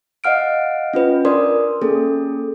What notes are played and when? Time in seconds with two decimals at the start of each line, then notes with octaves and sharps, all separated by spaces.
0.24 D#5 F5 F#5 F6 D7
0.94 C#4 F4 B4
1.25 D4 A#4 D5 C6 D#6
1.82 A#3 C#4 G#4 A4